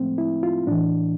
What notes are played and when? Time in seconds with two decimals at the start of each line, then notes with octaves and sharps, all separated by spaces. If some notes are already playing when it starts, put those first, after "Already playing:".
Already playing: A2 F3 G#3 A3 C4
0.18 E4
0.43 F4
0.67 A2 E3 D4